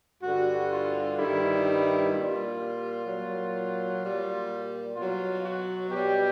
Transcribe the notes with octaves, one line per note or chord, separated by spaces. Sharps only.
G2 D3 G3 F#4
F4
G2 D#3 G3 E4
E4
A#2 G3 F4
A#2 F#3
A#2 G3
B2 F#3 F4
F#4
B2 G3 G4